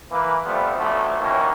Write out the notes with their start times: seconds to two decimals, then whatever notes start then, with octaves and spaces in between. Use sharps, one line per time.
0.12 E3 A#3 B4
0.46 F3 G3 A3 B3 C4 F4
0.77 A1 D2 D3 F3 A3
1.20 D#2 D#3 E3 A#3 C#4 F#4